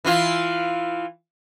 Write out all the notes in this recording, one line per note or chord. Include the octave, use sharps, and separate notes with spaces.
E3 E4 F4